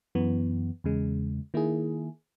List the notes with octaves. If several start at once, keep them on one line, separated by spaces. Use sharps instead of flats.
F#2 E3 B3
E2 C#3 G#3
D#3 A#3 E4 G#4